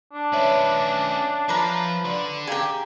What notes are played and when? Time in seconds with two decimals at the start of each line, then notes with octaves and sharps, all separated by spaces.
0.13 D4
0.33 C#4 B4 C#5 E5
1.49 F3 F4 B4 A#5
2.05 D3 D4 C6
2.47 G4 G#4 F5 G5 G#5 A#5